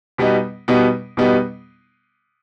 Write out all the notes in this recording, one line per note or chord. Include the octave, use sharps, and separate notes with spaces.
B2 G3 B3 D#4
B2 G3 B3 D#4
B2 G3 B3 D#4